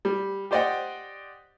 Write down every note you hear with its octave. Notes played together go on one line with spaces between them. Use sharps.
G3
G4 C5 D5 D#5 F#5 G5